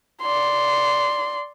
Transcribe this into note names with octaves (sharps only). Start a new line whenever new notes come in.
D5 C6